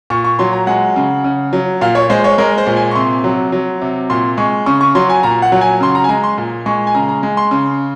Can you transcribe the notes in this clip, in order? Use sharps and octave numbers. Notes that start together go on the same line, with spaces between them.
A#2 C#6
C#6
F#3 C6
A#5
G#3 F#5
C#3
C#3
F#3
A#2 F5
C#5
G#3 C5
C#5
G#3 A#4
C5
A#2
G#5
C#6
C3 C6
F#3
F#3
C3
A#2 C6
G#3 C#6
C#3 C#6
C#6
F#3 C6
G#5
A#2 A#5
F#5
F#3
G#5
C#3 C6
A#5
G#5
G#3 A#5
C6
A#2
G#3 C#6
G#5
C#3 A#5
A#5
G#3
C6
C#3